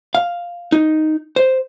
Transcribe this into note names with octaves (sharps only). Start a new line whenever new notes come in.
F5
D#4
C5